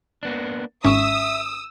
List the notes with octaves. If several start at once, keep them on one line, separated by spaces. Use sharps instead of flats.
A#3 B3 D4
G#1 C#4 E5 C#6 D#6 E6